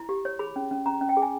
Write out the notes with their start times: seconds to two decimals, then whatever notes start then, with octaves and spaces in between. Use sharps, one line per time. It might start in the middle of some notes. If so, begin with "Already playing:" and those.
Already playing: E4
0.09 G4
0.25 C#5
0.39 G#4 B5
0.56 C#4
0.71 C#4
0.86 C#4 A#5
1.01 C#4
1.09 G5
1.17 G#4
1.22 G#5